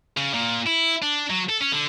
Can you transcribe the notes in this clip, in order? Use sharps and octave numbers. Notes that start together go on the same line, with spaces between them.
C#3
A#2
E4
D4
F#3
A4
C#4
D3